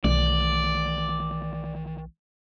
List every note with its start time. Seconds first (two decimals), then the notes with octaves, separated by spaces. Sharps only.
0.04 B1 D#3 E3 A3 D5